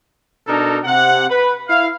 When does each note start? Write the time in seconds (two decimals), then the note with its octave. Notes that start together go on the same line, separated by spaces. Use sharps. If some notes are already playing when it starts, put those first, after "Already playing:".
0.47 B2 D4 D#4 A4 A#4
0.84 C3 F#5
1.29 B4
1.68 E4 F5